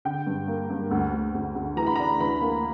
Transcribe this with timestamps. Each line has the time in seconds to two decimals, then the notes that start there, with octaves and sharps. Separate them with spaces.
0.05 D3 G5
0.27 G2
0.48 A#3
0.70 G2
0.91 D2
1.13 D2
1.34 D2
1.55 D2
1.77 E3 A#5
1.87 B5
1.96 D4 A#5
2.20 E3 B5
2.41 A#3